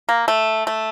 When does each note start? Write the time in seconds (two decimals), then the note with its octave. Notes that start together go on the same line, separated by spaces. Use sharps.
0.09 A#3
0.28 A3
0.67 A3